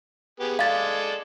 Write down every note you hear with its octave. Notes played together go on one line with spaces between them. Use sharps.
B3 G4 G#4
G#3 A4 D5 F5 A6